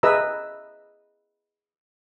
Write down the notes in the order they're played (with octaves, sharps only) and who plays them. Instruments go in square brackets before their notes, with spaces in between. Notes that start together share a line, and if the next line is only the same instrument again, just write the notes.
[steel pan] G#4 B4 D#5 E5 A#5 E6